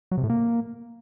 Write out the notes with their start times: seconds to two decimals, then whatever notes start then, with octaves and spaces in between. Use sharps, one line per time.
0.11 F#3
0.17 C3
0.24 A2
0.30 A#3